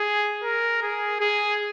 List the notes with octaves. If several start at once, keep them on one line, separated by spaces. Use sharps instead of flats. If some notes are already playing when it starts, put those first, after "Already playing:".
Already playing: G#4
A#4
G#4
G#4